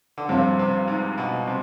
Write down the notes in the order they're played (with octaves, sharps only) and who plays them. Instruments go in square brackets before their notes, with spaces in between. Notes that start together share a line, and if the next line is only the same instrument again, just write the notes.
[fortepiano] D3
[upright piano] G2 F3 C4 F4 [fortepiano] C3
[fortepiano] C3
G#2
B2
C3